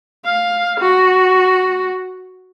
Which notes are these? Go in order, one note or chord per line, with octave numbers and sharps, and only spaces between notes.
F5
F#4